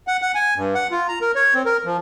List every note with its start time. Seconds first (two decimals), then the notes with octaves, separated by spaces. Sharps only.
0.08 F#5
0.22 F#5
0.35 G#5
0.56 G2
0.75 F#5
0.91 F4
1.08 A#5
1.21 A#4
1.35 C#5
1.54 C4
1.66 A#4
1.85 F3